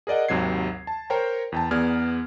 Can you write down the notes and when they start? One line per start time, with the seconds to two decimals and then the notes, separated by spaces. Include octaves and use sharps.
0.07 G#4 A#4 D5 D#5 F#5
0.28 G#1 D#2 C3 F#3 G#6 C7
0.87 A5
1.10 A#4 C5 C#5 G5 A#5
1.52 E2 G5 A5
1.71 E2 B3 G#4 D5 F6 G#6